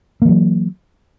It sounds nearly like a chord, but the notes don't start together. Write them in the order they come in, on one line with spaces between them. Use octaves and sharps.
A#3 E3 F#3